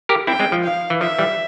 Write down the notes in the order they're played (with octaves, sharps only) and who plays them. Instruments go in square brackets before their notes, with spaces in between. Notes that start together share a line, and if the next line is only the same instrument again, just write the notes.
[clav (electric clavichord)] G4 A#4
[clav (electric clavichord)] C4 E4 [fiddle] G5
[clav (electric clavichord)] G#3 C4
F3
[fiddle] F5
[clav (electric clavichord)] E3
[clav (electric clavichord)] F3 [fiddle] E5
[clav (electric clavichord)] E3 G3